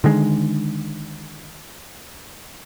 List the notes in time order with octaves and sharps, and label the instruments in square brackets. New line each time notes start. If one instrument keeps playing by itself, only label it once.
[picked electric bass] D3 D#3 G#3